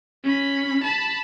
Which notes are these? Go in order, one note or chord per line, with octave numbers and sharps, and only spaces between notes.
C#4 B5
A5 B5